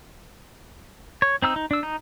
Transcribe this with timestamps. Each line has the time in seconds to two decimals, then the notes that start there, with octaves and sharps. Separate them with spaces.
1.22 C#5
1.42 C4 D#4 E6
1.56 D#4
1.71 D4 E6
1.83 D#4